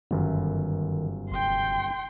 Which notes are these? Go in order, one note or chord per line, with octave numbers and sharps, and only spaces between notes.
G1 F#2 D#3
F1 G5 C6